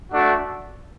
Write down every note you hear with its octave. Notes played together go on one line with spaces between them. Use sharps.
A3 D4 F#4